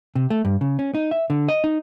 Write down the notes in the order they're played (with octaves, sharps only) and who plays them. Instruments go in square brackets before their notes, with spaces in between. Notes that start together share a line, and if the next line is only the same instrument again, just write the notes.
[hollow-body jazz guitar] C3
A3
G2
C#3
C#4
D#4
E5
D3
D#5
D#4